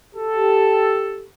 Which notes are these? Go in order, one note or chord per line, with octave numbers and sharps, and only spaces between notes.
G4 A4